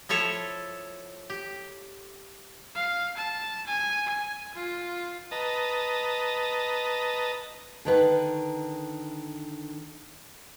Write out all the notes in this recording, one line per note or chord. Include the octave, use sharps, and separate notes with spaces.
F3 E4 A4 C#5 A5
G4
F5
A5
G#5
G#5
F4
B4 D#5 A5 A#5
D3 D#3 B4